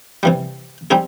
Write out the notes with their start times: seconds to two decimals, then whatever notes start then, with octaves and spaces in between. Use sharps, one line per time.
0.23 C3 E3 G3
0.91 G3 C4 D#4 G#4